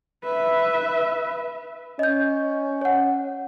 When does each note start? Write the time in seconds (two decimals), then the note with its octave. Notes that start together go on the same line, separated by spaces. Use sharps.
0.25 B4 E5
1.99 C#4 D#5 G6
2.82 C#5 F#5